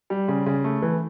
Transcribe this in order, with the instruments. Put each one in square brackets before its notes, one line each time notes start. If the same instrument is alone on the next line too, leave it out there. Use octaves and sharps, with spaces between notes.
[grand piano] G3
C#3
C#3
A3
E3